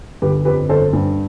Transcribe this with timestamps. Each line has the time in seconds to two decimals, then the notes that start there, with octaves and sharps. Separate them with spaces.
0.22 G1 G4 B4
0.45 F2 G4 B4
0.69 G1 A4 C5
0.93 G2